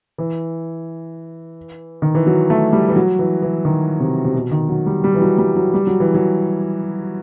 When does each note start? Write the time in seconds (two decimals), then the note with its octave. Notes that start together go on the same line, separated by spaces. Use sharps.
0.18 E3
2.02 D#3
2.15 E3
2.26 F#3
2.50 A3
2.73 G3
2.88 E3
2.96 F#3
3.19 E3
3.42 E3
3.65 D#3
4.00 C3
4.25 C3
4.35 B2
4.52 D#3
4.69 F#3
4.86 G3
5.04 G3
5.14 E3
5.21 F#3
5.38 G3
5.56 F#3
5.74 G3
5.87 F#3
6.00 E3
6.14 F#3